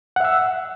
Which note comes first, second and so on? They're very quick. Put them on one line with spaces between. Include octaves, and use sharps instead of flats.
F#5 E5 E6